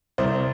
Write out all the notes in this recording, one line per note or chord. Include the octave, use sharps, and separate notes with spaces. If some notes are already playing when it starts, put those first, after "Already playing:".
C2 C5